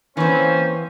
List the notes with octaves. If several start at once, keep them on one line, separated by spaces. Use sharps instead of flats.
E3 A#3 C4 C#4 C5